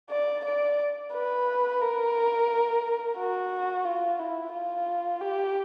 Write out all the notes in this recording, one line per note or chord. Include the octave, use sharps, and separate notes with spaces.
D5
D5
B4
A#4
F#4
F4
E4
F4
G4